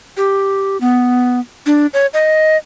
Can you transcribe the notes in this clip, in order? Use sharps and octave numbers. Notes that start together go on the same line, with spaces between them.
G4
B3
D4
C#5
D#5